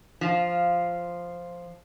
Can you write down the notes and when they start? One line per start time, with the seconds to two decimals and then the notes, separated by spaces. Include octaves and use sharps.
0.21 F3 F4